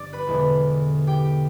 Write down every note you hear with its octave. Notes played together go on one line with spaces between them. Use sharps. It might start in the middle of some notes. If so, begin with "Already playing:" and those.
Already playing: G1 G2 F3 D5 D6
B4 B5
E1 E2 D3
G4 G5